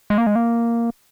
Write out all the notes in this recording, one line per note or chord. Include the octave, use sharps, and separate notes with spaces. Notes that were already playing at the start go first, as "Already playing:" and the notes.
G#3
A#3
G#3
A#3